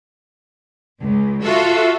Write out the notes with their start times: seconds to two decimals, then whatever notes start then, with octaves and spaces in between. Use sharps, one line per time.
1.01 C#2
1.44 F4 F#4 A4 E5